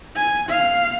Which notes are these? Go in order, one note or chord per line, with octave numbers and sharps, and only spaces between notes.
G#5
F5